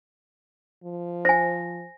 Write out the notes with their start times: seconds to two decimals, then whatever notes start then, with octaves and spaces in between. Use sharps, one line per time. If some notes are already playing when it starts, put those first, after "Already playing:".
0.84 F3
1.25 C5 G#5 A#6